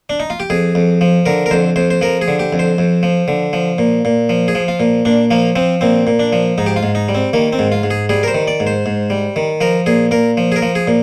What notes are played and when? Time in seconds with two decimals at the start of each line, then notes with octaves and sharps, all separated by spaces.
0.10 D4
0.20 D#4
0.30 F4
0.40 G4
0.50 F2 G#4
0.75 F2
1.01 F3
1.26 D3 A#4
1.46 A#4
1.51 F2 C5
1.76 F2 C5
1.90 C5
2.01 F3 A#4
2.21 G#4
2.28 D3
2.39 G4
2.53 F2
2.59 C5
2.78 F2
3.03 F3
3.28 D3
3.53 F3
3.78 A#2
4.05 A#2
4.29 F3
4.48 G#4
4.55 F3
4.68 F4
4.80 A#2
5.05 A#2 D4
5.31 F3 A#3
5.56 F3 C4
5.81 A#2 C4
6.07 A#2
6.19 D4
6.33 F3
6.58 G#2 D#4
6.66 G4
6.76 F4
6.83 G#2
6.95 D#4
7.09 G3
7.15 C4
7.33 D#3 A#3
7.53 C4
7.59 G#2
7.72 F4
7.83 G#2
7.90 G#4
8.09 G3 G#4
8.23 A#4
8.28 C5
8.34 D#3
8.48 D5
8.60 G#2
8.67 C5
8.86 G#2
9.10 G3
9.36 D#3
9.61 F3 A#4
9.86 A#2 G#4
10.11 A#2 A#4
10.37 F3
10.52 G#4
10.56 A#4
10.62 F3
10.75 G#4
10.87 A#2